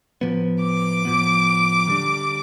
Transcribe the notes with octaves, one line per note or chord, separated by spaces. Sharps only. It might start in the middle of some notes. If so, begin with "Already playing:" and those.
A2 F3 B3
D6
A2 F3 B3
D3 G3 D4